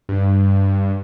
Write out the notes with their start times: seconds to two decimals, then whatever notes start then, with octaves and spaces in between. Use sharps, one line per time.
0.09 G2